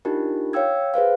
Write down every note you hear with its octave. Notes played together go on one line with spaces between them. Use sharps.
D4 D#4 F4 G4 A#4
C#5 F5 G5 E6 G#6
G#4 B4 C5 F5